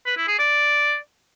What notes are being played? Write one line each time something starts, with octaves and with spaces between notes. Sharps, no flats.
B4
E4
G#4
D5